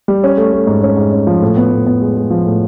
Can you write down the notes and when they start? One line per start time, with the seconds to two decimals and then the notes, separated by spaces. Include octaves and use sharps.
0.08 G3
0.24 C#4
0.37 A3
0.53 A3
0.67 G#2
0.83 C#4
0.97 G#2
1.13 C#4
1.27 F3
1.42 A2
1.57 B3
1.71 A2
1.87 B3
2.02 G#3
2.17 G#3
2.31 F3
2.46 A2